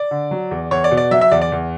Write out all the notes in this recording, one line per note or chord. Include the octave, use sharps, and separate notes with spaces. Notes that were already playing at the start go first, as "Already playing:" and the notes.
Already playing: D5
D3
F#3
E2
E2 C#5
D5
B2
D5
F#3 E5
E5
E2 D5
D5
E2